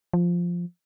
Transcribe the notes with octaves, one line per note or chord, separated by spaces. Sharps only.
F3